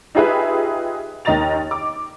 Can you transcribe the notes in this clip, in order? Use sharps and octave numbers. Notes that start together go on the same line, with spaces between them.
D#4 F4 G4 G#4 B4 E5
D#2 D#3 D#5 A#5 A6 F7
D6